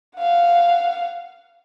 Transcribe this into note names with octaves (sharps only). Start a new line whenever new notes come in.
F5 F#5